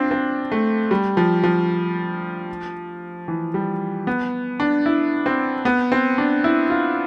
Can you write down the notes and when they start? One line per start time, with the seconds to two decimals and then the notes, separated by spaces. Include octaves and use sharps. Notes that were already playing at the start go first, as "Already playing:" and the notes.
Already playing: C4 D4 F4
0.11 C4
0.52 A3
0.91 G3
1.17 F3
1.44 F3
3.28 E3
3.54 G3
4.07 B3
4.60 D4
4.86 E4
5.26 C4
5.65 B3
5.92 C4
6.18 D4
6.44 E4
6.70 F4